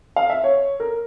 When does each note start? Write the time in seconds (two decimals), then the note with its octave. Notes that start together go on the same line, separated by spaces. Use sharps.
0.16 F5
0.30 E5
0.44 C#5
0.80 A#4